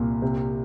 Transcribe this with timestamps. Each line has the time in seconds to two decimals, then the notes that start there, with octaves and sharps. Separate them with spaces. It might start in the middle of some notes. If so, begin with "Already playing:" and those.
Already playing: C2 A#2
0.22 C3